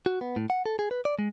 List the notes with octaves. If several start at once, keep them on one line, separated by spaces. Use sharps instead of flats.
F#4
B3
A2
F#5
A4
G#4
B4
D5
G#3